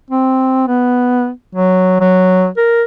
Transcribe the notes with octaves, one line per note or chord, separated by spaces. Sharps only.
C4
B3
F#3
F#3
A#4